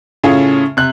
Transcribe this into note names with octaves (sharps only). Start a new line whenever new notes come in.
A2 C#3 C#4 F4 G#4
C3 F#6